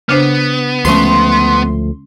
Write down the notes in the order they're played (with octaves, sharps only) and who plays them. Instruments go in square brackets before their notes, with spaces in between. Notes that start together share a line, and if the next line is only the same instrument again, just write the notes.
[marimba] C#3 D4 C5 [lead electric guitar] B3
[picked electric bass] D2 F3 A3 [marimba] G#3 C#4 [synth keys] C6